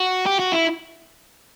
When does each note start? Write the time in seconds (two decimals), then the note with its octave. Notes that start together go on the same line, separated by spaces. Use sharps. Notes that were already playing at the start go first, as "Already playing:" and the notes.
Already playing: F#4
0.26 G4
0.39 F#4
0.52 E4